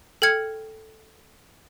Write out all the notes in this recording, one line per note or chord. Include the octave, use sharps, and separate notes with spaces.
A4 G5 F6 G#6 C#7